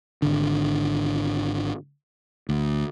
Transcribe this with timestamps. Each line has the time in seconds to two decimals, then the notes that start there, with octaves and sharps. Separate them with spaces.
0.22 G#1 D3
2.49 D2